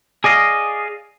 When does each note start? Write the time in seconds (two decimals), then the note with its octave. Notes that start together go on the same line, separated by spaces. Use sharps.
0.24 G#4 D5 D#5 F5